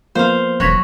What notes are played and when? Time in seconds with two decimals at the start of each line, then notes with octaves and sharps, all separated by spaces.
0.15 F3 A#3 B3 C5 F5
0.60 E1 F#3 F#4 C#5 A#6 B6